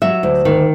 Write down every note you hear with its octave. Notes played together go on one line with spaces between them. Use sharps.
F#3 E5
D2
D#3